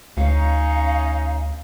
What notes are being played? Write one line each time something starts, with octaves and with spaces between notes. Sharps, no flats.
D2 C#4 D#4 F5